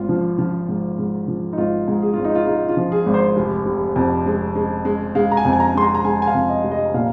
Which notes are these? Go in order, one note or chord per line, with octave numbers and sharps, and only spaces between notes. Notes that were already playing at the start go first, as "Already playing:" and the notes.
Already playing: G#1 F4
F3
F3
G#2
G#2
F3
D#4
G#1 F4
G#2
G#4
G#1 F4
D#4
F4
G#3 D#4
F4
F3
G#4
G#1
C5
F1
F1
F2
G#3
G#3
G#3
G#3 F5
A#5
G#5
F2
G#5
A#5
G#3 C6
A#5
A#5
G#3 G#5
G#5
F5
F2
D#5
F1
D#5
A#2 F5